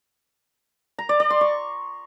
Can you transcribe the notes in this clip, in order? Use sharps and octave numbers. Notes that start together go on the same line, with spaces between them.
A#5
D5
D5
C6
C#6